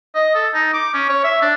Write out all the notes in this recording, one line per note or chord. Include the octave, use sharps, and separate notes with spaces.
D#5
A4
D#4
D6
C#4
C#5
E5
D4